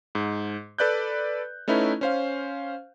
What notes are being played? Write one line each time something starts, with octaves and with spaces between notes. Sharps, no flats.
G#2
A4 B4 D5 F#6 G6
A3 C#4 D#4 E4 B4
C#4 C5 F5